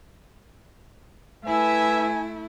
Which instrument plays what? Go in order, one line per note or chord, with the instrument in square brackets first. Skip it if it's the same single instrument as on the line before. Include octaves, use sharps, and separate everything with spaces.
[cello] A3 E4 [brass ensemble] B4 E5 [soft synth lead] G#5